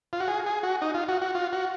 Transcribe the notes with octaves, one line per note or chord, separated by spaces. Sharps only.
F4
F#4
G#4
G#4
F#4
D#4
F4
F#4
F#4
F4
F#4